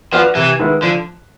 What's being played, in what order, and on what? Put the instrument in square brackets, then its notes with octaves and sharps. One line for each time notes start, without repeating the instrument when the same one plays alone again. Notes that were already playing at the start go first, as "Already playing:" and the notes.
[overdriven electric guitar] F3 [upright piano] B3 D4 F#4
[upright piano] C3 [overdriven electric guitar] E3
[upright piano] D#3 G#3 B3 E4
[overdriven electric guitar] D3 [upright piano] F3